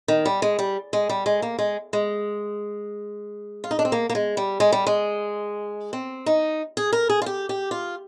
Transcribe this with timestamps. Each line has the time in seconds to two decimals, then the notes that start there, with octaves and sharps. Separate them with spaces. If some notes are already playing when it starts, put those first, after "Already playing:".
0.08 D#3
0.25 G3
0.42 G#3
0.59 G3
0.93 G#3
1.09 G3
1.26 G#3
1.42 A#3
1.59 G#3
1.93 G#3
3.64 F4
3.71 D#4
3.79 D4
3.85 C4
3.92 A#3
4.10 A#3
4.15 G#3
4.37 G3
4.60 G#3
4.72 G3
4.87 G#3
5.93 C4
6.26 D#4
6.77 G#4
6.93 A#4
7.09 G#4
7.22 F4
7.26 G4
7.49 G4
7.71 F4